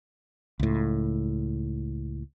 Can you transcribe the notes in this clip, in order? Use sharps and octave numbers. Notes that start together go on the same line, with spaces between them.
C#2 A2